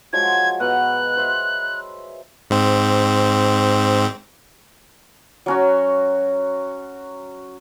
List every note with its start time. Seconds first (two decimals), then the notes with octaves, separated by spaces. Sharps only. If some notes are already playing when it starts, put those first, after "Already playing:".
0.13 F3 F#3 G#3 G#6
0.60 B2 B3 A#5 F#6
1.17 C5 E5
2.50 G#2 C4
5.46 F#3 C#4 F#4